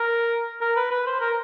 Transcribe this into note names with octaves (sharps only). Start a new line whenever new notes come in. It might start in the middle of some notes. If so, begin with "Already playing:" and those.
Already playing: A#4
A#4
B4
B4
C5
A#4